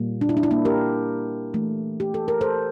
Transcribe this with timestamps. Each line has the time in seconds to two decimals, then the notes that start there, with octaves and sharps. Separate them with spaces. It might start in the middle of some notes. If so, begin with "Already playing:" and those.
Already playing: A#2 G3 A#3
0.21 D4
0.29 E4
0.37 D4
0.43 E4
0.51 A#3 D4
0.65 G4 A#4
1.54 E3 A3
2.00 G4
2.14 A4
2.28 A#4
2.41 A4 C5